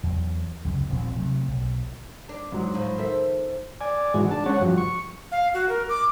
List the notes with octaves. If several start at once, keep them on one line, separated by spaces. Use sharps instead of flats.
E2 F#3
C#2 F#2 C3
D#1 A#1 F3 C4
C3 F#3 A3
B1
D4
G#2 F#3
E2 A2 F3
D#3 A4 C5 E5
D5 G#5
G#2 E3 G#3 F#4
D4 A5
G#3 C#4 C#5 F#5
G2 F3 F#4
C#6
F5
F#4
A#4
D6